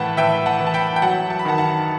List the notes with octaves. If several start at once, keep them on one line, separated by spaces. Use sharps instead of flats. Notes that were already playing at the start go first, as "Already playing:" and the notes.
Already playing: A2 E3 F#5 G5 A5 B5
E3 E5 G5
F#5 A5
E3
A5
G5 B5
G5
F#3 F#5 A5
A5
B5
D#3 F#5 A5
F#5 A5